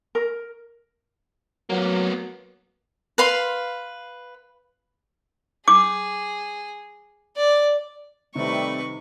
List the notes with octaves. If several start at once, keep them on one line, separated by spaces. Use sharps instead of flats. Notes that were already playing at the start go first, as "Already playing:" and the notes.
A#4
F#3 A#3 B3
B4 F5 C6
G#4 D6
D5
C3 D#3 G3 A3 C4 B4 C#6